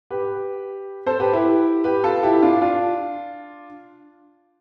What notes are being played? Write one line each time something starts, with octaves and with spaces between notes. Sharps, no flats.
G4 B4
A4 C5
G4 B4
E4 G4
G4 B4
F4 A4
E4 G4
D4 F4
D4 F4